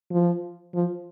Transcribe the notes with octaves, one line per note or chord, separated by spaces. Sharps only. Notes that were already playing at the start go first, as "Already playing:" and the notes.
F3
F3